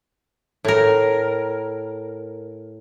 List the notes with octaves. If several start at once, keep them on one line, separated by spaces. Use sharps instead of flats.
A2 A#4